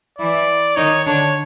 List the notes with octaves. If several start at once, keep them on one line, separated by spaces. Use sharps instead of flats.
E3 E4 D5
D#3 D#4 C#5
D3 D4 C#5